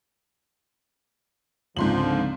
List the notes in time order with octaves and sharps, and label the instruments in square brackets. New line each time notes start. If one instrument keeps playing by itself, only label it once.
[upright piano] C#2 C4 [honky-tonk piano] G#2 C6 F#7 [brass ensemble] D3 F3